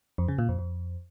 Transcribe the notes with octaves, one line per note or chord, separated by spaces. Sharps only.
F2
C#3
A#2
F2
F2